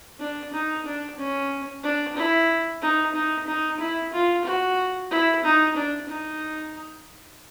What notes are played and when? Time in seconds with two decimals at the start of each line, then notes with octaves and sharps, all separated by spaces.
0.20 D4
0.53 D#4
0.85 D4
1.18 C#4
1.83 D4
2.16 E4
2.82 D#4
3.15 D#4
3.47 D#4
3.80 E4
4.13 F4
4.45 F#4
5.11 E4
5.44 D#4
5.76 D4
6.09 D#4